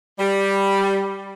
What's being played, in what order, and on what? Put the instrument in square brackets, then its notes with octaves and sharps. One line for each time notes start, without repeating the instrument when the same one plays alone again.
[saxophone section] G3